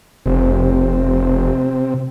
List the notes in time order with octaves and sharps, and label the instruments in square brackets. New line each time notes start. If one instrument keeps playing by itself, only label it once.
[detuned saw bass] F1 [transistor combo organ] C3